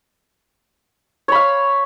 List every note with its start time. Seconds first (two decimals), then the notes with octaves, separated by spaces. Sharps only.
1.28 C#5
1.32 B5
1.35 F5